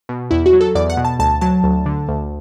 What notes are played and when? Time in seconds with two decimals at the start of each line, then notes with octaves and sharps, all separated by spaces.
0.09 B2
0.31 E2 E4
0.46 F#4
0.53 F#3
0.61 A4
0.75 E2 D5
0.90 F#5
0.97 B2
1.05 A5
1.19 D2 A5
1.41 F#3 A5
1.64 D2
1.86 D3
2.09 D2